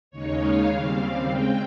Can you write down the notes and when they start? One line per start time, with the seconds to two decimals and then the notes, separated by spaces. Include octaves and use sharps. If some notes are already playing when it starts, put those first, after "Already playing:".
0.11 D#2 C#3 G#3 D#4 C#5
0.40 F5
0.68 D#2 C#3 G3 C4
0.97 F5
1.26 C#3 G#3 C4 G5